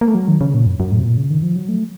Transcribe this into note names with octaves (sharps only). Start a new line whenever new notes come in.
A#3
A3
F#3
D#3
C#3
A#2
F#2
F#2
A2
C3
A#2
C#3
D#3
F3
F#3
A3